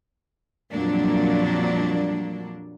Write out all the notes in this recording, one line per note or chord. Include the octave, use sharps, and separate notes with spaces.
F2 A#2 F#3 G3 A#3 D4